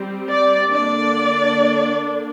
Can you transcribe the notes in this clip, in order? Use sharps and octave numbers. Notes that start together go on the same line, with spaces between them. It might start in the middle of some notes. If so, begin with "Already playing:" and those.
Already playing: G3 C4
D5
D3 A#3 D4 D5